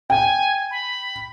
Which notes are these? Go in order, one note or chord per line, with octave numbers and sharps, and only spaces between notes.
G5 G#5
B5